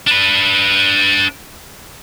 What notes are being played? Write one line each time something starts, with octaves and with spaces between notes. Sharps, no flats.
D4 B4